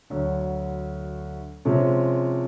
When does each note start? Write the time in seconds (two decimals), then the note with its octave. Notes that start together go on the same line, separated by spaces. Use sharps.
0.10 D2 D3 F#3
1.65 C3 F3 G#3 C#4